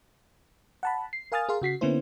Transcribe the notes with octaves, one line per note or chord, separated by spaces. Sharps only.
F#5 A5 B5
C7
A#4 F5 G#5 D#6 F6 A6
G#4 A#4 F5 C6
C#3 F#4 B6 C7
D3 A#3 B3 C#4 E4 C5